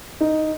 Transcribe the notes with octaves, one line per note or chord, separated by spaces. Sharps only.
D#4